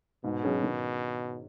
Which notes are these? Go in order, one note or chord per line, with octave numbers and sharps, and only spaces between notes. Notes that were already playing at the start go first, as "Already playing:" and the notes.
G#2 B2
F#3 C#4 G#4
D#3